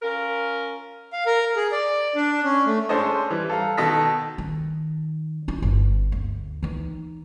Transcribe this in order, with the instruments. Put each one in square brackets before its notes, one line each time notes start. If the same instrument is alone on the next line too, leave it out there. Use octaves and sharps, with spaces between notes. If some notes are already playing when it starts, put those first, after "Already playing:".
[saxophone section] C#4 F4 A#4
[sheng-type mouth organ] F5
A#4
G#4
D5
D4
C#4
A3
[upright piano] G#3 C#4 D4 A4 C5 D#5
E3 G3
A4 F5 A#5
B2 D#3 A4 D#6 A#6 B6
[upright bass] D#3
D4 E4
G1
D2
E3 D#4